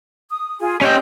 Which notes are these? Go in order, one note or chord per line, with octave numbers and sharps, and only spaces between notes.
D#6
F4 G#4 G#5
C#4 G4 D#5 G5 G6